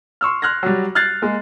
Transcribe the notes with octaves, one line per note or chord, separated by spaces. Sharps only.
C6 C#6 E6 F6
C6 F6 F#6 G#6 A#6
F#3 G3
F6 F#6 G#6 A6 C7
G#3 A#3